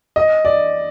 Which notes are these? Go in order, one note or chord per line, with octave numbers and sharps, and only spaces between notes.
D#5
D5